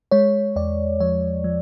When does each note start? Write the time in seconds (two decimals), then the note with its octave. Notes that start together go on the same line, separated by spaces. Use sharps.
0.11 G#3 C#5
0.56 E2 D5
1.00 F3 C#5
1.44 F3